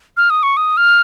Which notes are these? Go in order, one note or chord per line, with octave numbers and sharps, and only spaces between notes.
F6
D#6
C#6
D#6
F6